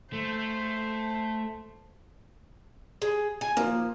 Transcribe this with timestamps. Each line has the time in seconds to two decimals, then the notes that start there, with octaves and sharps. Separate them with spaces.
0.13 A3 C5
3.02 G#4
3.41 G#5
3.57 F3 A#3